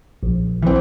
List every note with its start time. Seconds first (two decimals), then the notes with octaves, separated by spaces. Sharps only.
0.23 A#1
0.62 E3 C4